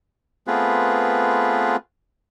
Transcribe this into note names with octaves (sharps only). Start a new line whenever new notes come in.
A3 B3 C4 F4 G#4 B4